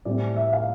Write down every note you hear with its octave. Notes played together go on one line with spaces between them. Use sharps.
A2 G3 C4 D5
E5
F5